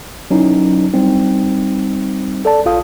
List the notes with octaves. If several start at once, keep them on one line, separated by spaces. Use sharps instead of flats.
F#3 C#4 D#4 E4
G3 C4 D#4
A4 D5 A5
A#1 F4 A4 F5 D#6